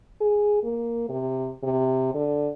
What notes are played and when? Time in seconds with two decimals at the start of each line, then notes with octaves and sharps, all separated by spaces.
0.21 G#4
0.63 A#3
1.09 C3
1.63 C3
2.14 D3